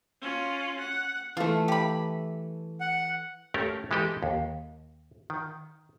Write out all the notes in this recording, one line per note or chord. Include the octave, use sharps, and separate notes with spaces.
C#4 F4
F#5
E3 A3 F4
G4 B5
F#5
A3 C#4 G4 A4 A#4 C#5
E3 G#3 B3 G4 A4 D#5
D#2
D#3